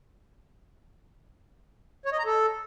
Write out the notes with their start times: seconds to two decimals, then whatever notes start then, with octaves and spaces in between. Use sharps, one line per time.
2.06 C#5
2.12 D#5
2.19 A#5
2.25 A4